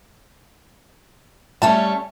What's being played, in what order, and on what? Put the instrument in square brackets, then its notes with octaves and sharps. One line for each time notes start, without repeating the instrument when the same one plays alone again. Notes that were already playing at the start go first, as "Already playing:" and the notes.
[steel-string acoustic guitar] G3 A3 C#4 [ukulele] A5